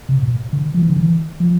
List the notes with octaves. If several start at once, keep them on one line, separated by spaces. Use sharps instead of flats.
C3
A#2
D3
F3
E3
D3
E3
F3